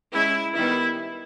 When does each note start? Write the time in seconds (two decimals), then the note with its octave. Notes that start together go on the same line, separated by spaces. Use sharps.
0.14 G#3 C#4 E4
0.56 D#3 G3 B3 E4